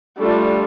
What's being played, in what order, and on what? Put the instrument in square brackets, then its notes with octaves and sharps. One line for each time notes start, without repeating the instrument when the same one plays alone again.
[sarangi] G3 [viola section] A3 D4 F4 A4